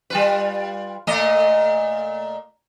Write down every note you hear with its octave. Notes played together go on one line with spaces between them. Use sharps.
G3 F4 B4
A#2 A3 D#5